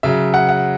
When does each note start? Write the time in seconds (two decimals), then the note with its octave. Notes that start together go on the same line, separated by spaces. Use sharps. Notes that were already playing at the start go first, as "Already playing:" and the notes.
0.03 C#3 F#3 E5
0.34 F#5
0.49 F#5